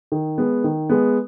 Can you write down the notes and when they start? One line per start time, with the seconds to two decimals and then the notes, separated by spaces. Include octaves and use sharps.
0.12 D#3
0.38 G#3 B3
0.64 D#3
0.90 G#3 B3